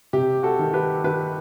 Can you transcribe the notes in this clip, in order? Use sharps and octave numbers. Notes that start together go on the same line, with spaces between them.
C3 G4
F#4 A4
D#3
G4 B4
D#3 G4 B4